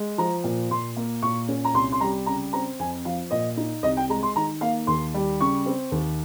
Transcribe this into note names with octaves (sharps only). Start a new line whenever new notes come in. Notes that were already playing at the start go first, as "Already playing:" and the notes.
Already playing: G#3
F3 A#5
A#2
A#2 C6
A#3
A#2 C#6
C#4
A#5
C2 C6
C6
G3 A#5
C#3 A#5
C4 A#5
F2 G#5
F3 F5
A#2 D#5
D#4
C2 D#5
G5
G#3 A#5
C6
D#3 A#5
A#3 F5
D#2 C6
G3
C#3 C#6
C4
D#2